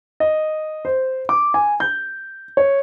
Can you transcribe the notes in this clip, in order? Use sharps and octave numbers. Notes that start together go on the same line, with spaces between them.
D#5
C5
D6
G#5
G6
C#5